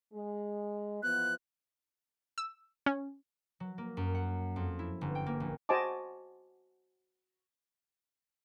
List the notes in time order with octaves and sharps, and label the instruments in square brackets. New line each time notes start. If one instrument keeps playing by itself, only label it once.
[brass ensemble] G#3
[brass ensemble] E3 F3 B3 [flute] F#6
[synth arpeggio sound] E6
C#4
[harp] F#3
A#3
F#2
F#5
F2
E4
G1
G5
A#3
A#1
[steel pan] F#4 C5 D#5 G#5 A5 D6